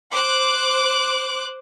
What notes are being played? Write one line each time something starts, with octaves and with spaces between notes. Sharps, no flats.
C5 D6 F#6